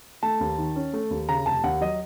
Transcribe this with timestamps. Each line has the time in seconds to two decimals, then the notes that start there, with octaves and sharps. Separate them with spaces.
0.23 A3 A5
0.41 D#2
0.58 D#3
0.76 C#4
0.93 A3
1.11 D#2
1.29 C#3 A#5
1.46 F1 A5
1.64 D#2 F#5
1.81 F#3 D#5